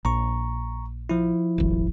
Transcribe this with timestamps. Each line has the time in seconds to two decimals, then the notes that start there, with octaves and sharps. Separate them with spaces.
0.05 A#1 A#5 C#6
1.09 F3 E4
1.58 D#1 G#1